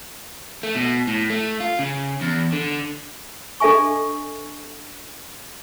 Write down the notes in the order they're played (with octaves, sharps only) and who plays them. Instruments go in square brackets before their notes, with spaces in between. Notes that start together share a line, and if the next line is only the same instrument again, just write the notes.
[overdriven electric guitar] A3
B2
A2
A3
F4
C#3
E2
D3
[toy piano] D4 A4 D#5 E5 G#5 C#6